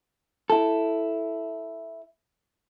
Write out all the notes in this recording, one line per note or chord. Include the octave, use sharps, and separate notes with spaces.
E4 A4